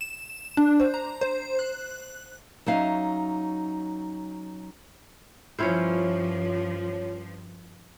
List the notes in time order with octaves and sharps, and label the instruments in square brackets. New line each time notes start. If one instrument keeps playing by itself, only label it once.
[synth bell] E7
D4
C5
A#5
C5
F#6
[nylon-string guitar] F#3 C#4 D#4 E5 F5
[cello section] G2 F3 [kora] C#4 E4 C5 [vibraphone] F4 C#5